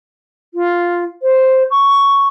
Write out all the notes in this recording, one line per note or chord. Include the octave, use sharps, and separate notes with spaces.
F4
C5
C#6